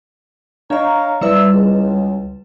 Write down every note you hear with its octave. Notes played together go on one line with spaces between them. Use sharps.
D4 C#5 D#5 F5 A#5
G3 E4 B4 D5 E5 E6
C#2